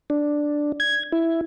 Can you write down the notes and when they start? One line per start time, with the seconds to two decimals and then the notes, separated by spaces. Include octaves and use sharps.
0.10 D4
0.80 G#6
1.12 E4